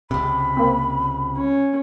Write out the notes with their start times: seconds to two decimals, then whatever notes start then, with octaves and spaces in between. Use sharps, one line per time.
0.11 C#2 C3 B5
0.57 A#3 C4
1.37 C#4